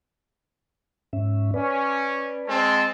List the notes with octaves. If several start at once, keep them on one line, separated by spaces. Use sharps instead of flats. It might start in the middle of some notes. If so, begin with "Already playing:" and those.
G#2 C#4 E5
C#4 B4 D5
G#3 C4 A5